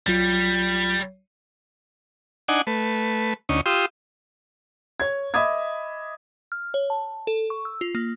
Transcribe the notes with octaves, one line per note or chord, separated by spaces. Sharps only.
A#1 F#3 G3 F4
D4 D#4 F#5 G#5
A3 B4
D2 C#4 D#4
F4 G4 C6 D#6 E6
C#5 G#6
D#5 E5 B5 D6 D#6 G#6
F6
C#5
A5
A4
C#6
E6
F4
A#3